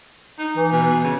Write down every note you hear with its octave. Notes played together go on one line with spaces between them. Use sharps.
D#4
E3
B2
C#3